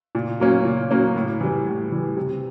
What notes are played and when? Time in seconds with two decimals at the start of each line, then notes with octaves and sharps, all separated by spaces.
0.15 A#2
0.40 F#3 A#3 C#4
0.65 A#2
0.91 F#3 A#3 C#4
1.16 A2
1.41 E3 G3
1.67 A2
1.92 E3 G3
2.17 C3